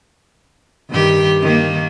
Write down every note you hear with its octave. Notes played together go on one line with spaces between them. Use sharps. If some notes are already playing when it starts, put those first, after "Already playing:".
G2 D#3 G4
D#3 A#3